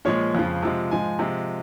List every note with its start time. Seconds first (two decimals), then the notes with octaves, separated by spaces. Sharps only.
0.05 A#2 F3 G#3 C#5
0.35 F2 C#3 F3
0.63 C3 F3 G#3
0.91 G#2 F3 G#3 G#5
1.19 C3 F3 G#3